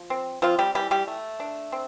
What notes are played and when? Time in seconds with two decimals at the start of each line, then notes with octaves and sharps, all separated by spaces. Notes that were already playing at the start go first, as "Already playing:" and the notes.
Already playing: F3
0.10 C4
0.42 F3 C4 F4
0.59 G3 G4
0.75 E3 G3 G4
0.91 G3 G4
1.07 A3
1.40 D4
1.72 C4